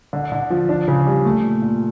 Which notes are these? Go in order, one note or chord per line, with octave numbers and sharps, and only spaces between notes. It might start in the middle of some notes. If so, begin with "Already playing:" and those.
D3
D3
F3
D4
C#3
G3
A3
A#2
A#2